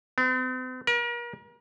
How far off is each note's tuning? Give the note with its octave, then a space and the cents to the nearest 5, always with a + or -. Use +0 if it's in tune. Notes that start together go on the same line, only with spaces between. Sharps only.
C4 -45
A#4 +40